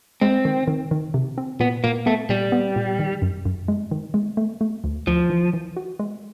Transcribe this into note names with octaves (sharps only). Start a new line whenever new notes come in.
G#3 C4
D#3
D#3
D#3
C3
C4
A#2 B3
A#2 A#3
A3 B3
A#2 G3
B3
A#2
D#3
F#2
F#2
G#3
D#3
G#3
A3
A3
D2
D2 F3
E3
E3
F#4
G#3